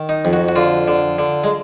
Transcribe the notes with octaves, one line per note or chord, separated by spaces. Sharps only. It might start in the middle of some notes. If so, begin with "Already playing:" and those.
Already playing: D#3
D#4
F2
F#4
F#4
D3 F4
D3
D3
G#3